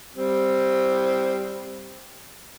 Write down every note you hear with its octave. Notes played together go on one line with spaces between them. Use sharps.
G3 C4